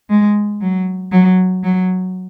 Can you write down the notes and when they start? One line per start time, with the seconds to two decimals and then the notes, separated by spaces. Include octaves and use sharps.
0.10 G#3
0.61 F#3
1.12 F#3
1.63 F#3